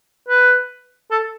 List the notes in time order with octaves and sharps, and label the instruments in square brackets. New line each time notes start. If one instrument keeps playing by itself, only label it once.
[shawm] B4
A4